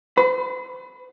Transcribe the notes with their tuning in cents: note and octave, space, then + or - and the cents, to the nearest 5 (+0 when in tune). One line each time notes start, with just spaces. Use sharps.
C5 -40 B5 +5